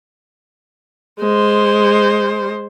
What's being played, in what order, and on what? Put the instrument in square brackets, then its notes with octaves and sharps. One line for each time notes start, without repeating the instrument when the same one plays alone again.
[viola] G#3 C5